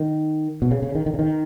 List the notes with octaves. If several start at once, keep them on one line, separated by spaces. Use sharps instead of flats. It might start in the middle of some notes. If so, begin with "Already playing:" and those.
Already playing: D#3
B2
C#3
C#3
D#3
D#3
C#3
D#3